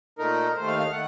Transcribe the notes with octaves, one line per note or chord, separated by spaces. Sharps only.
A#2 A3 D#4 A#4
D#2 D#3 A3 C5
F5
F5
D#3 A3 F#5